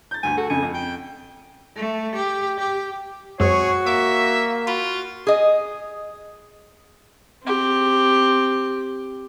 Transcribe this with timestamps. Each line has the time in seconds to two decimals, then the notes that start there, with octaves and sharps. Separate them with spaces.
0.11 G6 A6
0.23 D2 G2 G#5
0.37 F#4 A4
0.50 F2 C#3 G#5 C#7
0.63 F2
0.75 G5
1.76 A3
2.15 G4
2.58 G4
3.40 F#2 G#3 C4 F#4 G#4 C#5
3.86 A#3 E5 D6
4.67 F4 F#4 B5
5.27 G#4 D#5
7.44 C4 G4